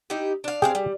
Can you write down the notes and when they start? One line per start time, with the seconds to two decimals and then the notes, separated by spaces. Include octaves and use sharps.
0.10 D#4 E4 G4
0.44 D4 F5
0.62 G#3 C4 G4 G#4 F5 G5
0.75 G3